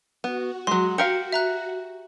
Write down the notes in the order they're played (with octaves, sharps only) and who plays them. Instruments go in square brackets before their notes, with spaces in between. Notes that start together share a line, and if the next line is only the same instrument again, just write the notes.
[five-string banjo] B3 [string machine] F#4
[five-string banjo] F#3 G#3 [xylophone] C6
[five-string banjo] G4 A#4 F5 [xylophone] C#7
[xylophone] E5 A#5 F#6